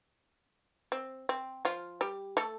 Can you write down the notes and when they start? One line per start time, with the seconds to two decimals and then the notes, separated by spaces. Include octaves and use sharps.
0.92 C4
1.29 C4
1.65 F3 F4
2.01 G3 G4
2.37 A3 A4